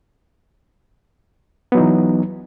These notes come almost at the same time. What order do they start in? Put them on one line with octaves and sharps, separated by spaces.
B3 F#3 D#4 E3